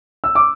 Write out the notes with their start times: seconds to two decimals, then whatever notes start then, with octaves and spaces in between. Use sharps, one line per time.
0.24 E6
0.35 D6